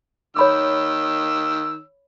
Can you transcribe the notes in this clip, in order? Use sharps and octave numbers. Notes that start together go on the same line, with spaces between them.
D#3 C#5 B5 D6 E6